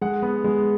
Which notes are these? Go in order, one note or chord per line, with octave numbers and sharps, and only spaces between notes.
G#3 F#5
B3
G#3